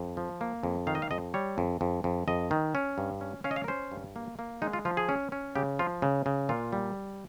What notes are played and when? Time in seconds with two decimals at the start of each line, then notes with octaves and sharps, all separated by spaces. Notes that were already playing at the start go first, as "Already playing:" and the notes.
Already playing: F2
0.17 F3
0.41 A#3
0.63 F2
0.87 D#3 F5
0.95 D#5
1.02 F5
1.11 F2 D#5
1.34 G3 C#5
1.58 F2
1.81 F2
2.04 F2
2.28 F2 D#5
2.51 D#3
2.75 C#4
2.98 G2
3.21 C#4
3.44 C#4 F5
3.51 D#5
3.56 F5
3.64 A#4
3.68 C#4 C5
3.92 G2
4.16 A#3
4.39 A#3
4.62 G#3 D#4
4.73 F4
4.85 F3 F4
4.97 G#4
5.09 C#4
5.32 C#4
5.55 C#3 G4
5.79 F3 F4
6.02 C#3
6.26 C#3
6.49 A#2 F4
6.73 G3